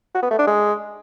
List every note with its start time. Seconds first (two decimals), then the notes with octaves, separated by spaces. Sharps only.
0.14 F#4
0.23 B3
0.31 A3
0.39 D4
0.47 G#3